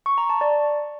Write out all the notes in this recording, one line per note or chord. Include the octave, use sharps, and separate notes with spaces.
C#6
A#5
A5
D5